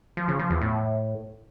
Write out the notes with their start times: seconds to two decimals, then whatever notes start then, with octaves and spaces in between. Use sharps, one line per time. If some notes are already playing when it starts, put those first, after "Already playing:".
0.17 F3
0.28 C#3
0.39 F3
0.50 E2
0.61 A2